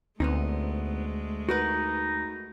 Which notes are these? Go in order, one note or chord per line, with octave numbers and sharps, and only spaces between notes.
D2 G#3 A3 B3 C4 D#4
D#4 F#4 A#4 B4